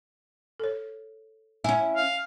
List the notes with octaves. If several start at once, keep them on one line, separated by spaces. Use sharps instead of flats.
A4 C#5
C#4 E4 G#5
F5